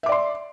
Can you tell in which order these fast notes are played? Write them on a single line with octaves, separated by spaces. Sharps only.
E5 D6 D5 C6